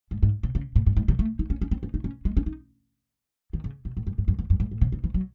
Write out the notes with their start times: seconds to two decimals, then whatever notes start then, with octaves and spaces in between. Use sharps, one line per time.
0.11 G#2
0.23 G#2
0.43 C3
0.55 C#3
0.76 A2
0.86 G#2
0.97 G#2
1.08 C3
1.19 A3
1.39 D#4
1.50 C#4
1.62 C#4
1.71 C4
1.83 C#4
1.94 D#4
2.04 C#4
2.25 G#3
2.37 C#4
2.46 D#4
3.53 D#3
3.64 C#3
3.85 C3
3.97 A2
4.07 F#2
4.18 G#2
4.28 F#2
4.39 E2
4.50 F#2
4.60 G#2
4.71 A2
4.81 C3
4.92 C#3
5.04 E3
5.14 F#3